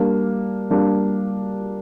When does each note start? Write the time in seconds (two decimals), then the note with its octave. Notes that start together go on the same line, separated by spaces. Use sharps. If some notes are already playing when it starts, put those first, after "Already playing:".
Already playing: G3 A#3 D4
0.70 G3 A#3 D4